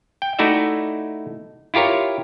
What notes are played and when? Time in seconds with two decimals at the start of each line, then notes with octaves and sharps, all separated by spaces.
0.22 G5
0.39 A3 D#4 E4 F#4 D5 E5
1.74 E4 F4 G4 A#4 C#5